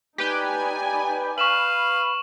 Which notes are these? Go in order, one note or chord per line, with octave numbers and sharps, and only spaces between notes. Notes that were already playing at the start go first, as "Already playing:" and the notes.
D#4 G4 B4 D5 G5 G#5
B4 F5 C#6 E7 F#7